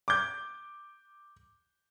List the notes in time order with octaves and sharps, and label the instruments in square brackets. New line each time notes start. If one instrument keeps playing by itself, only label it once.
[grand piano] D6 G6